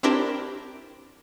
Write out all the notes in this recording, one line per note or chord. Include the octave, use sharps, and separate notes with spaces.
C4 D4 E4 G4 A#4 C5